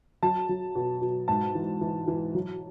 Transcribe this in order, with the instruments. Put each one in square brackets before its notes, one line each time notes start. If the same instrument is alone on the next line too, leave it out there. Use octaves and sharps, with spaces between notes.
[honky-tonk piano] F#3 A5
F#3
B2
B2
G#2 A5
E3
E3
E3
F#3